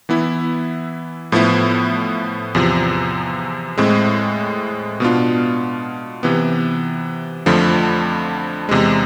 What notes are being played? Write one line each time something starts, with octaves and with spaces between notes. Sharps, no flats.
E3 B3 E4
A2 F3 B3 E4
E2 C3 F3
A2 G#3 C4
B2 B3 D4 F4
C3 E3 B3
F2 D3 F3 A3
E2 C3 G#3